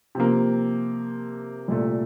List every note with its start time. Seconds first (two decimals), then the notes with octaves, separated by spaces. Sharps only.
0.15 C3 F3 A#3
1.68 C2 A#2 A3